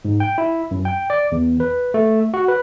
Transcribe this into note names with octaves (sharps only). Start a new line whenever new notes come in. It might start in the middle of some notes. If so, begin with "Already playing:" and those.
G#2
G5
E4
F#2
G5
D5
E2
B4
A3
F#4
B4